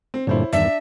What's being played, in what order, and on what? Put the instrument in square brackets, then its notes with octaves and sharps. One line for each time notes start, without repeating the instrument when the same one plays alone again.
[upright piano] C4
[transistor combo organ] G2 A#2 D3 [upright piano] E4 C5 C#5
[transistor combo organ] E2 G2 D#3 [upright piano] D4 [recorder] E5